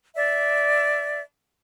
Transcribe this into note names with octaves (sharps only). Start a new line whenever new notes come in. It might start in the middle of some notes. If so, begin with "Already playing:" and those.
D5 E5